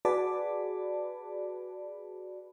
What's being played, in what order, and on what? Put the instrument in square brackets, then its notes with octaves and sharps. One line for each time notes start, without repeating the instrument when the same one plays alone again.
[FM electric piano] F#4 G#4 B4 D5 A5 B5